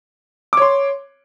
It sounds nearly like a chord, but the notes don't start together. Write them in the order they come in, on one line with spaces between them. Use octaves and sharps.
D6 C#5 C6